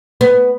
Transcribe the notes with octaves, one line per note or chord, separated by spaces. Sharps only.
B3